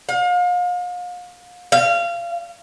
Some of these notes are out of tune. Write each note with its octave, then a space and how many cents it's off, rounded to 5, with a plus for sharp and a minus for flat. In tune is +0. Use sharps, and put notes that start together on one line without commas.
F5 +35
F5 -25